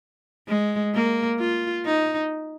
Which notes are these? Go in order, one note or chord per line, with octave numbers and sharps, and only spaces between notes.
G#3
A#3
F4
D#4